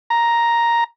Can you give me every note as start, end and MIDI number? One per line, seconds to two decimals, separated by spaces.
0.10 0.84 82